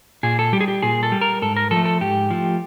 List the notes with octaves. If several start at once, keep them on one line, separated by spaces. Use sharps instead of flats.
A#2 G#4
A4
G3 G4
G#4
G4
A#2 G#4
A4
G3
A#4
G#2 A4
A#4
F3 A4
A3
A4
G#2 G4
F3 A3